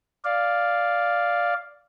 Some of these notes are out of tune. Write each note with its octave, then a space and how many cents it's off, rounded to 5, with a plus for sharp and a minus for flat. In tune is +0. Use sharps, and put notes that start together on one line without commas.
D5 +0 F5 +0